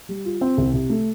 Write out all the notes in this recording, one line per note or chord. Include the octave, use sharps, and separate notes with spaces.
G3
F4
C4
C2
C3
A3